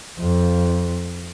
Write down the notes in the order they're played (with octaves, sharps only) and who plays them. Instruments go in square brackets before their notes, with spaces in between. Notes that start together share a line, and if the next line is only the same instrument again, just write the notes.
[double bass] F2